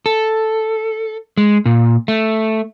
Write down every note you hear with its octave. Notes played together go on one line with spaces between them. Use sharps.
A4
G#3
A#2
A3